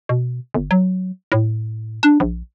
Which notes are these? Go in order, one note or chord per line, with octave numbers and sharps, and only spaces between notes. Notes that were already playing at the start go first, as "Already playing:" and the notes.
B2
G1
F#3
A2
D4
A#1